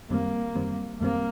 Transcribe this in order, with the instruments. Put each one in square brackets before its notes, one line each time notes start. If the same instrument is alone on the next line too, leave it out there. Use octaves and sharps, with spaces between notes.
[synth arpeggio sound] F#2 D#3 G3 C4 [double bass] A#3
[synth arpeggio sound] F#2 D#3 G3 C4
[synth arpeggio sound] F#2 D#3 G3 C4 [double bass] A#3